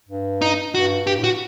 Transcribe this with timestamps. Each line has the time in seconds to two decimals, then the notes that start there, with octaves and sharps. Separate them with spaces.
0.09 G2
0.42 D#4
0.75 G2 F#4
1.07 G2 G4
1.18 A2
1.24 F#4